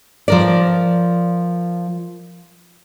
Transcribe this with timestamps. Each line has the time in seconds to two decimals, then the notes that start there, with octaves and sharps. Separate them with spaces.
0.28 F3 A#4 D5